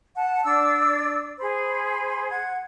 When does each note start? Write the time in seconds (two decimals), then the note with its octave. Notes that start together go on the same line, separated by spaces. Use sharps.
0.15 F#5 A5
0.44 D4 D5 E6
1.39 G#4 C5 B5
2.30 F#5 G#6